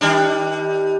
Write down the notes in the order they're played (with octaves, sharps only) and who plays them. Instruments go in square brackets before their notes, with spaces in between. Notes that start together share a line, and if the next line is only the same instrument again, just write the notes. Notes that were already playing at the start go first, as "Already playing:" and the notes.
[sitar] D#3 G3 D4